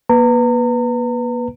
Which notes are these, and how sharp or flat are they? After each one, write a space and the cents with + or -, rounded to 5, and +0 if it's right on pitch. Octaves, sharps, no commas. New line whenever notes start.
A#3 +40 B4 +0 A#5 -35